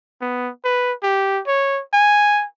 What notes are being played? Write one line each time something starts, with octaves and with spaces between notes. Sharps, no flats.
B3
B4
G4
C#5
G#5